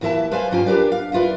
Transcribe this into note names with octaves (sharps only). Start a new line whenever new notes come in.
D#2 E3 E4 A#4 E5 A5
B4 C5 D5 F5 G#5
G2 F#3 C#4 F4 G5 G#5
D4 G4 A#4 B4 D5
F5
D#2 E4 F4 B4 D5